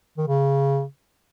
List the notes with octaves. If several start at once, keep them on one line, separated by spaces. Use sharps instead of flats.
D#3
C#3